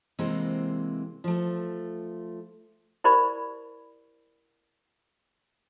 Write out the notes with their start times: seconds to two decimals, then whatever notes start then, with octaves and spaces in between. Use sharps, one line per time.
0.19 C3 E3 G#3 A#3 C4
1.24 F3 A3
3.04 E4 G4 A#4 C5 D5 B5